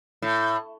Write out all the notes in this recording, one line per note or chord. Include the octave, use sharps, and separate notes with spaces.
A2